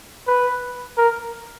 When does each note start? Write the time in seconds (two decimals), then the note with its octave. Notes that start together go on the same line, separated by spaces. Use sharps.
0.28 B4
0.98 A#4